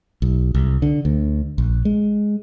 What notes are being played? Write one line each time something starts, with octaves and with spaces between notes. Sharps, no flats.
B1
C2
D3
D2
A#1
G#3